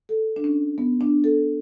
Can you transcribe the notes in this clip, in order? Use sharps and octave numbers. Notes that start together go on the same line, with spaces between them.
A4
D4
C#4
B3
D4
A4